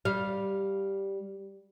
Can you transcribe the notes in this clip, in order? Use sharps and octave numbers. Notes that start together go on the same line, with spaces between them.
G3 F5